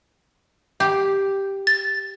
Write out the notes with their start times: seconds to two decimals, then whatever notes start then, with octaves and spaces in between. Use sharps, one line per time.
0.80 G4
1.67 A6